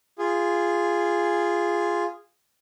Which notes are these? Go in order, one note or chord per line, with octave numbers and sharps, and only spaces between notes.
F4 G#4